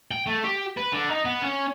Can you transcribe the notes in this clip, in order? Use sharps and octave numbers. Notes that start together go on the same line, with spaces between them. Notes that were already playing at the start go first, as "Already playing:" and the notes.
G5
A3
G4
B4
D3
D#4
B3
C#4